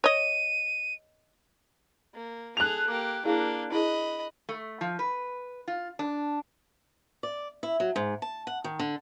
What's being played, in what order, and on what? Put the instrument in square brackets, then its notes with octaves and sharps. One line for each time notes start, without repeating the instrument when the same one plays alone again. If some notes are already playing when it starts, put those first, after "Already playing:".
[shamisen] C#5 D#5 [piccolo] D#7
[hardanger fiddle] A#3
[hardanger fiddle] G#4 A4 [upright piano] F#6 F7
[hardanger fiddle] A#3 G4 [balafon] D6
[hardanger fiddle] A#3 D4 [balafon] E4 G#4 F5
[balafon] E4 G#4 [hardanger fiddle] D#5 B5
[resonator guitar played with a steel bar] A3
F3
B4
F4
D4
[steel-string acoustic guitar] D5
E4
F#3
G#2
A5
F#5
D#3
D3